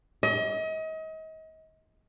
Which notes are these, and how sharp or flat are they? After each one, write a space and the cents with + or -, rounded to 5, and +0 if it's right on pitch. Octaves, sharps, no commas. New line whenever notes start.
D#5 +35